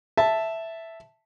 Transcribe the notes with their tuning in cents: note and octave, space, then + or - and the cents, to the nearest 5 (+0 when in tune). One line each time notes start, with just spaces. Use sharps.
E5 +0 A5 +0